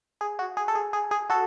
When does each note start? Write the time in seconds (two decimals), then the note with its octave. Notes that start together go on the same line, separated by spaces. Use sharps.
0.21 G#4
0.39 F#4
0.57 G#4
0.68 A4
0.75 G#4
0.93 G#4
1.11 G#4
1.30 F#4 A4